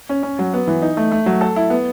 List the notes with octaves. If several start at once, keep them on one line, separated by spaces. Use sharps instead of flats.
C#4
C#4
F#3
B3
E3
D#4
A3
A3
F#3
A4
E4
B3